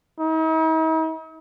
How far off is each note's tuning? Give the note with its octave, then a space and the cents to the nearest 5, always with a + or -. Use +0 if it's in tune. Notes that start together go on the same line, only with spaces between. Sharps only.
D#4 +45